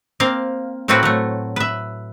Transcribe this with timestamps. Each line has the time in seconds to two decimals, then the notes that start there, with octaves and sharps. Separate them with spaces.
0.20 A#3 C4 F5
0.88 A2 A3 A#3 C4 F#4 B4
1.03 F#3 A3
1.56 B4 E5